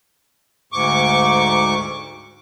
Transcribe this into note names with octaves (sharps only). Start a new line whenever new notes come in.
D2 G#2 C#6 D6